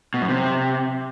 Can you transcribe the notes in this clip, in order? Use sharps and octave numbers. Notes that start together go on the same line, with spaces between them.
B2
F#2
C3